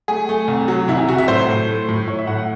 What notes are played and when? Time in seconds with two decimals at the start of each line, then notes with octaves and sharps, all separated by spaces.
0.08 A3 G#4
0.29 A3
0.48 C2
0.68 F#3
0.88 C2 E4
0.98 G#4
1.08 C2 F#4
1.18 E5
1.28 A2 C5
1.48 A2
1.69 A3
1.89 A2
2.08 A2 C#5
2.18 E5
2.27 A2 F#5
2.38 F#5